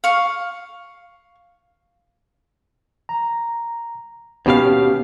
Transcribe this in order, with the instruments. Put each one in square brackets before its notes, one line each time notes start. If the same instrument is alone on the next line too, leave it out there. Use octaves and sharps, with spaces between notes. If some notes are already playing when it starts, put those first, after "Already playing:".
[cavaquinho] F5 C#6
[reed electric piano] A#5
[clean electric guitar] D#2 B2 F5 [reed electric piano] B3 C#4 G4